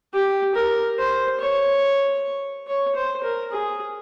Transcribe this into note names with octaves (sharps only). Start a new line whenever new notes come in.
G4
A#4
C5
C#5
C#5
C5
A#4
G#4